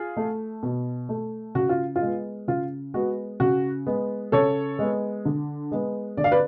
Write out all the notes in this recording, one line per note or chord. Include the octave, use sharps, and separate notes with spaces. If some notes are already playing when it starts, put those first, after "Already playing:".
Already playing: F4 G#4
A3
B2
A3
C#3 F#4
F4
F4
G#3 B3
C#3 F4
G#3 B3 F#4
C#3 F#4
G#3 B3
C#3 A4 C#5
G#3 B3
D3
G#3 B3
D3 D5
F5
B4 D5